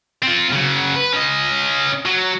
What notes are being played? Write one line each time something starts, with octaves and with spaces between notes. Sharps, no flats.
C4 F4
C#3 F#3
B4
C#4 D#5
F#3